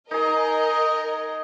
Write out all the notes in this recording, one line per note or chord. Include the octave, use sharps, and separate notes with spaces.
D#4 G#4 A#4 D#5